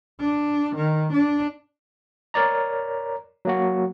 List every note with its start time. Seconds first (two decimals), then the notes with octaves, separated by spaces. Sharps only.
0.20 D4
0.76 D#3
1.12 D4
2.34 A#4 C#5 D5 A#5
3.45 F#3 A#3 F#4